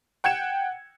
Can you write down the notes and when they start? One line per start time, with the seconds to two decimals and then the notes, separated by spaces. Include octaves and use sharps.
0.24 F#5 G5 G#6 C#7 E7